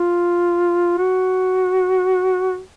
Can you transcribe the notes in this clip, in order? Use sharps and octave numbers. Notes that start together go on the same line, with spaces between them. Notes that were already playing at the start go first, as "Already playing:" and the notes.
Already playing: F4
F#4